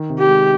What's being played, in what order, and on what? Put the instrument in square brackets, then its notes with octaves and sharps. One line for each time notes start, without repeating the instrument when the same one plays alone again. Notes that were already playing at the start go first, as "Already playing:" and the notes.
Already playing: [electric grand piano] D#3
C3
[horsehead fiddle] G4
[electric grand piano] G#3